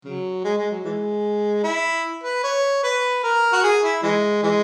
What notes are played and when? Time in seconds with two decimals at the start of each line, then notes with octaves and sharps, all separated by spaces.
0.05 C#3 F#3
0.44 G#3
0.58 G#3
0.71 F#3
0.84 E3 G#3
1.64 E4
2.24 B4
2.44 C#5
2.83 B4
3.23 A#4
3.52 F#4
3.63 G#4
3.83 E4
4.03 E3 G#3
4.43 E3 G#3